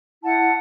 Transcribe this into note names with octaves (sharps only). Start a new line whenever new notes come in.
E4 F#5 A5